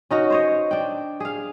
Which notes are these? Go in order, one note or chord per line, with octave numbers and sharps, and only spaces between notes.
C#4 D#4 F#4
C5 C#5 D#5
D4 G5
G#4 F5